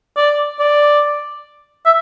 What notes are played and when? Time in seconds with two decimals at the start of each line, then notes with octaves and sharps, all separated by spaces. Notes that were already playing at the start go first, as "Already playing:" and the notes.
0.17 D5
0.60 D5
1.86 E5